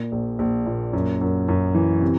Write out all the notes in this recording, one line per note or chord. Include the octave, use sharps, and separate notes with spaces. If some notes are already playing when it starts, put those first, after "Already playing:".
Already playing: A#2
A#1
A#1
A#2
F#2
F#2
F#2
E3
C3